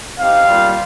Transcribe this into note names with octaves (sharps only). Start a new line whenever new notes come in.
C4 D#4 G4 F5
G3 A#3 F4